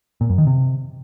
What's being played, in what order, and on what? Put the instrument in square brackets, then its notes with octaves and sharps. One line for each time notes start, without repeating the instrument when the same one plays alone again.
[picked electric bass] A#2
F#2
D#3
C3